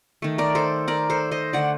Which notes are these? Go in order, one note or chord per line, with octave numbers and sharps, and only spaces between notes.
D#3 A3
A#4 D5
A4 C5
A#4 D5
A4 C5
C5 D#5
D3 A3 D5 F#5